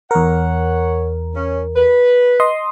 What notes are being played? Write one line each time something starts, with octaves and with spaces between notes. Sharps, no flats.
E2 A#4 C#5 F#5
C#4
B4
D#5 C6 D#6